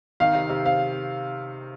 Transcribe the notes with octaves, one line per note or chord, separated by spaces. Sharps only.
D#3 F5
C3
C3
C4 F5